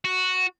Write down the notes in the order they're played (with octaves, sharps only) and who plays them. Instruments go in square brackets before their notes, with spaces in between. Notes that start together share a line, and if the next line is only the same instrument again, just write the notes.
[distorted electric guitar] F#4